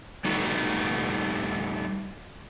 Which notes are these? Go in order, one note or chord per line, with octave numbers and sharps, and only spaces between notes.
G3 A3 B3 D#4 F#4